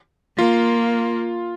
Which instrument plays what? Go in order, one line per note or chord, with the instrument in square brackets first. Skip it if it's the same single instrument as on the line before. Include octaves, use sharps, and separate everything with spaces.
[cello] A#3 [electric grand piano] F4